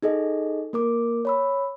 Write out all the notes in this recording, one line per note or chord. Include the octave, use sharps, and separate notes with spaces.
D#4 G#4 A4 D#5
A#3 A#4 D6
C#5 B5 E6